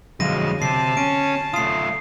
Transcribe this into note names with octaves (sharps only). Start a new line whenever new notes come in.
F2 D3 F#3 G#3 F5 A#6 D#7
C3 A5 C7
C#4 D7
A3 F4 D#6 C7